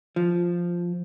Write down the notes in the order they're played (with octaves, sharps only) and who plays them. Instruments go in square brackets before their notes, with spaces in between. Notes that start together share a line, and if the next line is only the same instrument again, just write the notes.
[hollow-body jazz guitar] F3